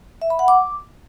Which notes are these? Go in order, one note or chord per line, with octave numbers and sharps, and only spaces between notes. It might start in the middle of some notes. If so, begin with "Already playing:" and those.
E5
B5
F#5
D6